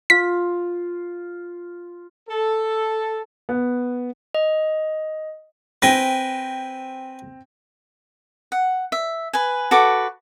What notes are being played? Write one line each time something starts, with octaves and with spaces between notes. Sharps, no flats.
F4 B6
A4
B3
D#5
C4 B4 G5 G#5 A#6
F#5
E5
B4 G#5
F#4 A4 B4 D6